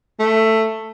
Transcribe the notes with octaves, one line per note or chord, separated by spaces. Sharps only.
A3